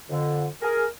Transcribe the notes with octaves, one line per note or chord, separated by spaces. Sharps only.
F2 D3
G#4 A#4